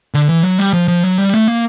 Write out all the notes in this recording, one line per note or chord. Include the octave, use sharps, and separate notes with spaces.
D3
E3
F#3
G3
F3
F3
F#3
G3
A3
A#3